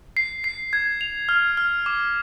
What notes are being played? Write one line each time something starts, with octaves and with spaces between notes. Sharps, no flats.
C7
C7
G#6
F7
F6
F6
D6